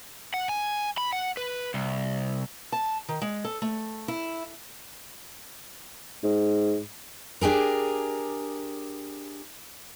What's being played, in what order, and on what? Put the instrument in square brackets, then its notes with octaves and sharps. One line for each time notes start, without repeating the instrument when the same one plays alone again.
[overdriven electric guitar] F#5
G#5
B5
F#5
B4
C2
[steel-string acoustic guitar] A5
D#3
G#3
A4
A3
E4
[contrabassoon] G#2
[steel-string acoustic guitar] D4 G4 G#4 A#4